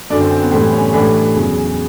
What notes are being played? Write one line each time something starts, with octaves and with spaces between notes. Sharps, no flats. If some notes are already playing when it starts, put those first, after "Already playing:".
F#2 D3 F#3 D4
C4
C4
B3
A2 E3 G3 C4
C#4
A2 E3 G3 D4
E2 C#3 F#3